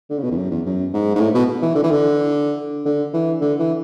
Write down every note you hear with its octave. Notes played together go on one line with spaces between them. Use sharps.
D3
C#3
B2
E2
F#2
E2
F#2
G#2
G#2
A2
B2
E3
D3
E3
D3
D3
E3
D3
E3